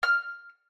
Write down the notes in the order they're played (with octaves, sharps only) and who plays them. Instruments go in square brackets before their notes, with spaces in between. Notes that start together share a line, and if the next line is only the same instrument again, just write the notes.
[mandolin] F6